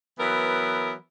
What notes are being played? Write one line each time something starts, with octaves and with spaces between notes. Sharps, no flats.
E3 F#3 B3 A#4